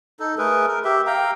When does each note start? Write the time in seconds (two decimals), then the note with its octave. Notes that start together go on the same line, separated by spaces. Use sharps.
0.20 D#4 A4
0.38 A3 G#4 A#4 B4
0.68 A#4
0.85 G4 E5
1.07 F5 G5 A#5